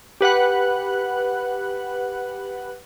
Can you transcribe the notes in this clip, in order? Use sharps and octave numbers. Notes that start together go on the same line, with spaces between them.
G4 B4 F#5 F#6